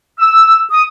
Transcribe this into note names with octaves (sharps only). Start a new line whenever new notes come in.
E6
D#6